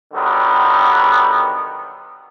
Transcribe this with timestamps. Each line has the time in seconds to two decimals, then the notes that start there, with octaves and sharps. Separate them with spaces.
0.14 D3 D#3 F#3 G3 B3